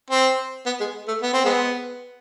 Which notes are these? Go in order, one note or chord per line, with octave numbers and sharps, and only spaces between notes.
C4
B3
G#3
A3
B3
C4
G#3 B3